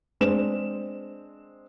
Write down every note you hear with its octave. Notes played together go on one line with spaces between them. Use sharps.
G#3 C4 D4 E7